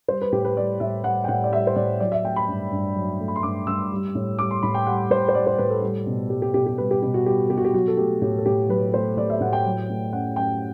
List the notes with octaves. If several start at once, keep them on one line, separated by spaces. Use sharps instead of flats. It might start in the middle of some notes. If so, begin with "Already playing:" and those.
G3 C5
B4
A2 G4
B4
G3 D5
A2 E5
G3 F#5
G5
A2 F#5
D5
G3 E5
C5
A2 D5
F#3 D5
E5
A3 G5
B5
G2
G2
F#3
A3
B5
C6
G2 D6
G2 E6
G3
A2
G3 D6
C6
A2 B5
G5
G3 F#5
A2 C5
C5
G3 D5
C5
A2 B4
A4
G3
B2
G3 G4
G4
B2 G4
G4
G3 B4
G4
B2 G4
F#4
G3 G4
B2 G4
F#4
G4
F#3 F#4
A4
A3 G4
A2 G4
A4
A2 G4
F#3 B4
A3 C5
A2 D5
E5
A2 F#5
G5
F#3
A3
F#2 F#5
F#2 G5